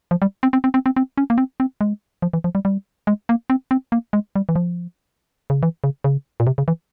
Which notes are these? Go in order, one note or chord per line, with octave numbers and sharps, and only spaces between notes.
F3
G3
C4
C4
C4
C4
C4
C4
C#4
A#3
C4
C4
G#3
F3
E3
F3
G3
G3
G#3
A#3
C4
C4
A#3
G#3
G3
E3
F3
C#3
E3
C#3
C#3
A#2
C3
C#3
E3